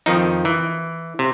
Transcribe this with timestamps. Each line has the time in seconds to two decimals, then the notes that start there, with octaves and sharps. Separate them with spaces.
0.06 F2 D#3 F3 D#4
0.45 E3
1.19 C3